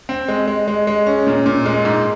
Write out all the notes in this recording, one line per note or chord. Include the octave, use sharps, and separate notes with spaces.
C4
G#3
G#3
G#3
G#3
C#4
A#2
A#2
G#3
G#2